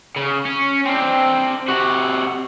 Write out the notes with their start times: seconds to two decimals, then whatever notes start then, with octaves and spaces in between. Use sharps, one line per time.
0.16 C#3
0.45 C#4
0.85 C4 D4
1.68 C3 F#4